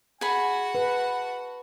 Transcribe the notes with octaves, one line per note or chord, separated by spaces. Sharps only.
F#4 G#4 F#5 G#5 B5
B4 A5